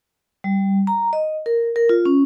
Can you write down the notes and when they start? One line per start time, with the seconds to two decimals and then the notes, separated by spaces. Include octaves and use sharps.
0.44 G3
0.87 A#5
1.13 D#5
1.46 A#4
1.76 A#4
1.89 F4
2.05 C#4